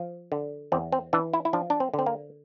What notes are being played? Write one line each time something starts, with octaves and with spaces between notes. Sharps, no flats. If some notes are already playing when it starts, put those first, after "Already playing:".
Already playing: F3
D3
E2 C4
C4
E3 D4
E4
E4
F3 D4
D4
C4
D3
C4
A#3